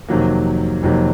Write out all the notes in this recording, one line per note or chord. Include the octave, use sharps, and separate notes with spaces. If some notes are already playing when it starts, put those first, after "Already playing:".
F2 C3 D#3 F#3 A#3
F2 C3 D#3 F#3 A#3